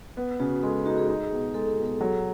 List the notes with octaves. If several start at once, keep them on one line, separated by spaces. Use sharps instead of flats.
B3
C#3 F#4
G#3 A4
A4
D#4 F#4
G#4
D#4
B2
G#3 A4
A4
B2
A4
F#3